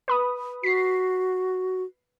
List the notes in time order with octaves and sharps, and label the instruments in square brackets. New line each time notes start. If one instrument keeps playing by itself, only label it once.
[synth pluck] B4 B5 D#6
[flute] F#4 [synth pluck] B6 C7